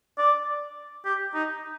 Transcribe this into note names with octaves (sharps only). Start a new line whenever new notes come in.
D5
G4
D#4